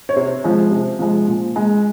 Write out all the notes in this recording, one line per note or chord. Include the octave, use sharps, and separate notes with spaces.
C#5
C3 C5
F3 G#3
C3
F3 G#3
A#2
G#3